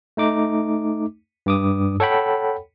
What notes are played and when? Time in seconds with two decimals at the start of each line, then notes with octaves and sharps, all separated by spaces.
0.17 A3 D#4 D6
1.46 G2 D6 D#6
2.00 A4 C#5 F#5 G5 B5